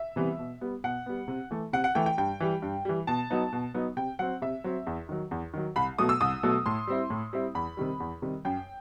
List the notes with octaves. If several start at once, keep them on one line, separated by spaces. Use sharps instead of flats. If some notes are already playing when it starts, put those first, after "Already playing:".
Already playing: E5
C3 E3 G3 B3
B2
G3 B3
B2 F#5
G3 B3
C3
E3 A3
C3 F#5
F#5
E3 A3 G5
G5
G2 G5
E3 G3
G2
E3 G3
B2 A5
F#3 B3 D#4
B2
F#3 B3 D#4
C3 G5
F#3 C4 F#5
C3 E5
F#3 C4
E2
D#3 F#3
E2
D#3 F#3
C2 B5
B2 F#3 A3 D#6
E6
C2 D#6
B2 F#3 A3
A2 C6
G3 C4 E4
A2
G3 C4 E4
E2 B5
C3 D#3 G3
E2
C3 D#3 G3
F#2 G5